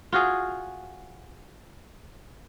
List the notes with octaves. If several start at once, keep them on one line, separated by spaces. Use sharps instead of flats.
F4 F#4 G#4